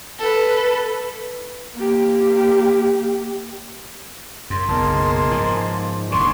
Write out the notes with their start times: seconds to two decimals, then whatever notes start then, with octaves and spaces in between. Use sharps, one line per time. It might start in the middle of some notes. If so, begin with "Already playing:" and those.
0.19 A4 B4
1.76 A#3 G4
4.50 F#2 C6
4.68 F#1 B1 G#3 A#3 A5
5.31 G#2 F3
6.12 D#1 D3 D5 G#5 C6 C#6